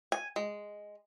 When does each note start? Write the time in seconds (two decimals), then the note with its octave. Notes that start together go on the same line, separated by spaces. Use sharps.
0.12 G#5
0.36 G#3